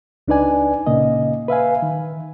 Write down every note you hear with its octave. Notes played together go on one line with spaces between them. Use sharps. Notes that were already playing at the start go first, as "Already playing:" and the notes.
C#2 D4 D#4 B4 D5 G#5
A#2 C#3 A#3 D#5
B4 E5 F5 G#5
D#3